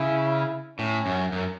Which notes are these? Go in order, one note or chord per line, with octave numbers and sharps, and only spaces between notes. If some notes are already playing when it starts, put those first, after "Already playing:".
Already playing: C#3 E4
A2 C#4
F#2
F#2